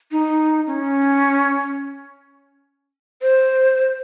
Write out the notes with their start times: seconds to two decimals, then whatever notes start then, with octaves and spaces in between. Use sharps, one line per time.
0.11 D#4
0.67 C#4
3.22 C5